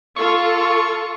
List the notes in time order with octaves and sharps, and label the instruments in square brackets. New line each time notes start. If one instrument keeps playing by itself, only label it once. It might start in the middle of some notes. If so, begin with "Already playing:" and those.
[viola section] F4 A4 [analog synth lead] C#6